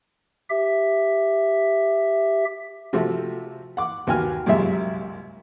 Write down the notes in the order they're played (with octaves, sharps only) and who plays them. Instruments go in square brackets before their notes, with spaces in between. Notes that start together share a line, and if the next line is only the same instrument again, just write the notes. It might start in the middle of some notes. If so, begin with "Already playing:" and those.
[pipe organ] G4 E5
[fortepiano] C3 F3 A3 F#4
F#5 D6
D#2 B3 F#4 G5 G#5 F6
C2 F#2 A#2 G3 G#3 E5